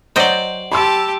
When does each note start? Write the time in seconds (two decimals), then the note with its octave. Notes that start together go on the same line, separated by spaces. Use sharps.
0.16 F#3 C5 D5 D#5 G5
0.72 G4 A5 B5 C6 E6